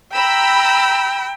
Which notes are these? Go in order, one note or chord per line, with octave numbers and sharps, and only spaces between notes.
G5 A#5 B5 E6